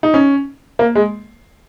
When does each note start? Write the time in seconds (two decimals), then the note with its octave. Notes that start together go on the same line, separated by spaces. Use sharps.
0.03 D#4
0.14 C#4
0.79 A#3
0.95 G#3